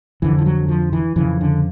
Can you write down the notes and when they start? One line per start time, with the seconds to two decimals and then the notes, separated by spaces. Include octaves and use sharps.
0.22 F2 D3 E3
0.39 F3
0.46 F#3
0.69 F3
0.93 E3
1.16 F2 C#3 E3
1.41 D3